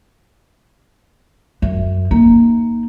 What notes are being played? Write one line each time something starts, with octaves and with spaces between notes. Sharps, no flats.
F#2 E5
A#3 D#4